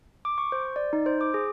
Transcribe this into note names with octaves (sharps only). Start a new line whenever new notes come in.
D6
C#6
C5
D5
D#4
C5
D6
G#4